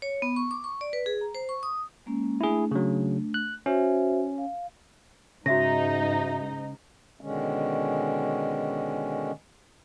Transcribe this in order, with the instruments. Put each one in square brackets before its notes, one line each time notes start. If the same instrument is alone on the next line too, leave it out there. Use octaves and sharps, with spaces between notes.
[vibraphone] C#5
B3
C#6
D6
C#6
D5
B4
G#4
A#5
C5
C#6
D#6
G#3 A#3 C#4
[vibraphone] A3 D4 [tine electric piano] E4 G#4
[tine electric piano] C#3 F#3
F#6
[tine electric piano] C#4 [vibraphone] F#4 C5 E5
[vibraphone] F5
[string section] G#2 D#4 [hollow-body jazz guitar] C#3 [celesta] F#4 E5 A#6
[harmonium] B2 D3 D#3 G#3 C#4